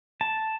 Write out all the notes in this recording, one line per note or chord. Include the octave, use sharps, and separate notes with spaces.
A5